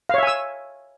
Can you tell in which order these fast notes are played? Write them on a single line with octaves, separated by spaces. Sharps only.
F5 C#5 E5 G#5 E6